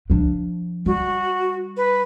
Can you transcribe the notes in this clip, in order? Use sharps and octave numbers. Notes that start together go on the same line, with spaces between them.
F3 D4
G3 F#4
B4